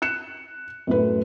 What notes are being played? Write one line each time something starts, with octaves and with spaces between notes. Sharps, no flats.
F#6 C#7 E7
F#2 A2 B4